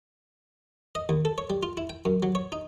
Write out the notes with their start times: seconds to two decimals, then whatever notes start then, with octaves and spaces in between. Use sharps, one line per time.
0.95 D#5
1.09 D#2
1.25 A4
1.38 C#5
1.50 G3
1.63 F4
1.77 E4
1.90 G5
2.05 F#2
2.23 F#3
2.35 C#5
2.52 D#4